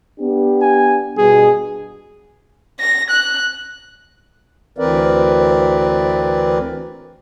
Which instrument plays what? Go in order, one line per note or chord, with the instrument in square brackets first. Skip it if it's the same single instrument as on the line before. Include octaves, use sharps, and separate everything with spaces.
[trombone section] B3 D4 G4
[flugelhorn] G#5
[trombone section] G2 B2 [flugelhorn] G#4
[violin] A#6
F#6
[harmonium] D2 E3 C4 A#4 B4 D5